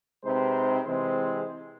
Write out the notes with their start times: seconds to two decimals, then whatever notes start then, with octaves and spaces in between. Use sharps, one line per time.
0.24 C3 G#3 D#4 B4 C5
0.86 C3 E3 G#3 G#4 C5